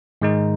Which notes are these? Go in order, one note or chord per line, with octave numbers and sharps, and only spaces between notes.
G#2 D#3 G#3 D#4